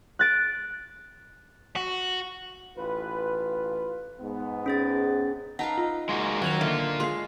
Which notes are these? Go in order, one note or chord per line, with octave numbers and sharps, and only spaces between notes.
F#6 A6 D7
F#4
A1 F4 B4
G#2 B3
C#4 G#4 A6
D#4 B4 F5 F#5 A5
F4
G#3 A#3 F#4
D#3 F#3 C#4 F#4 G#6 F7
D3 A#3 F4 E5
G#3 F4 C#5 C6 C7